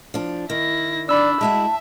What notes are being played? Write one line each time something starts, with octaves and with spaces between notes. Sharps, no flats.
F3 D4
D#3 E4 A#6
D4 D5 B5 E6
G#3 E4 F#4 E5 A5